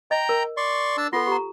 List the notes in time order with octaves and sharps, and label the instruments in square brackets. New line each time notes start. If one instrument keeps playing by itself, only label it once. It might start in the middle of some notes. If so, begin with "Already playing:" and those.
[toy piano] D#5 [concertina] G5 A#5
[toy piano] A#4
[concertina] D5 C6 C#6
D4 A5 E6
[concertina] B3 C6 [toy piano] F4 A4
[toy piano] G4 A#5